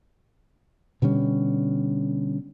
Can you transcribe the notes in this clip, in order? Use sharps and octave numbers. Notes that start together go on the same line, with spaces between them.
B2 D3 G3 C#4